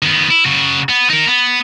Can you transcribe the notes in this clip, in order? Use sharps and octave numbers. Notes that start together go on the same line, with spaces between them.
D#3 B3
E4
C#3 F#4
B3
D#4 A#4
B3